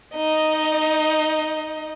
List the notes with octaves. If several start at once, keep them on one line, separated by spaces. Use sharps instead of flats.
D#4 D#5